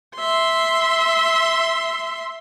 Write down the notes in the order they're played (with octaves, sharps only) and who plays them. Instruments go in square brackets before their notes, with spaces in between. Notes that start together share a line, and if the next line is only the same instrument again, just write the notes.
[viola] E5 C6